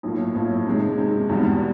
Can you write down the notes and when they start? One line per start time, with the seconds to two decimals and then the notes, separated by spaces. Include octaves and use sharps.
0.03 B1 A2 F3 A#3
0.35 B1 A2 F3 A#3
0.67 C3 D#3 G#3
0.98 C3 D#3 G#3
1.29 E2 B2 G3 B3